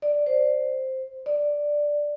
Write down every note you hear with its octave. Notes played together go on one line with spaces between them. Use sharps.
D5
C5
D5